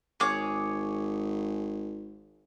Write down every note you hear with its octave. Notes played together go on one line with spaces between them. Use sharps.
G#1 G#4 C#5 D6